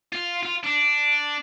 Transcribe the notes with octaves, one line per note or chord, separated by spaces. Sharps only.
F4
F4
D4